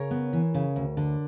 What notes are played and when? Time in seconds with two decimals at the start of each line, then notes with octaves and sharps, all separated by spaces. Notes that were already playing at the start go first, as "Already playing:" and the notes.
Already playing: C#3 A#4 C#5
0.11 B3
0.33 E3
0.54 C#3
0.76 D2
0.97 D3